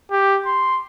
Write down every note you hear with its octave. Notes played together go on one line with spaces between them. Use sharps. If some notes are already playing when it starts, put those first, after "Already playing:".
G4
C6